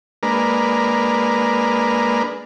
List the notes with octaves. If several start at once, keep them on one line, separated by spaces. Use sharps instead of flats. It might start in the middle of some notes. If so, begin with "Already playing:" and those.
G#3 A#3 D4 A#4 B4